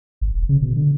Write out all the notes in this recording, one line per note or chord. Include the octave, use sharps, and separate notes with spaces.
G#1
E1
C#3
B2
D3